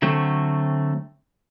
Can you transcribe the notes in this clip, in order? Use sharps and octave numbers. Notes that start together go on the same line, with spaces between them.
D3 F#3 A3 C4